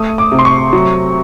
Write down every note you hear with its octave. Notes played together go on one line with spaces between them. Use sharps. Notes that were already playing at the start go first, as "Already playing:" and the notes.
Already playing: A3 D#6
D6
C3
C6
C#6
F#3